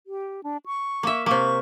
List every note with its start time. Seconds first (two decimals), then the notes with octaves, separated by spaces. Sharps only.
0.07 G4
0.43 D4
0.66 C#6
1.03 A#3 E5
1.26 C3 A#3 C#6